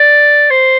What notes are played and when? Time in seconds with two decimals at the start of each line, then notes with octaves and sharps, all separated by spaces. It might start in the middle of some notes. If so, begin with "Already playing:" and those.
Already playing: D5
0.50 C5